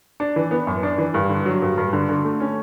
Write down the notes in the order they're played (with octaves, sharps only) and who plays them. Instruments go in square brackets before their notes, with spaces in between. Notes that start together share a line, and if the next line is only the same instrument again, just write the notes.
[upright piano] D4
E3
B3
F#2
D4
E3
G2
D3
F#3
G2
G2
D3
D3
A3
C#4